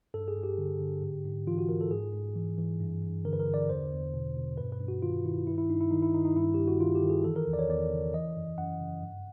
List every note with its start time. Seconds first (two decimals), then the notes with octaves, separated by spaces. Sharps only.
0.14 G2 A4
0.28 G#4
0.36 G2
0.43 G4
0.58 D3
0.80 D3
1.02 G#2
1.25 G#2
1.47 E3 F4
1.58 F#4
1.69 E3 A#4
1.81 A4
1.91 G#2 G#4
2.13 G#2
2.35 E3
2.58 E3
2.80 G2
3.03 G2
3.25 D3 A#4
3.33 B4
3.40 A#4
3.47 D3
3.54 D5
3.69 E2 C5
3.92 E2
4.14 B2
4.36 B2
4.58 G2 B4
4.72 B4
4.80 G2
4.88 F#4
5.02 D#3 F4
5.25 D#3 E4
5.47 G2 E4
5.58 E4
5.70 G2 D#4
5.81 E4
5.91 D#3 D#4
6.02 E4
6.13 D#3 D#4
6.25 D#4
6.36 G2 E4
6.54 G2 G4
6.68 F#4
6.80 D#3 F4
6.95 G4
7.02 D#3
7.10 G#4
7.24 E3 A4
7.36 A#4
7.47 E2
7.53 D5
7.59 C#5
7.69 E2 D5
7.92 C#3
8.14 E3 D#5
8.36 F#2
8.58 F#2 F#5
8.80 C#3
9.03 G2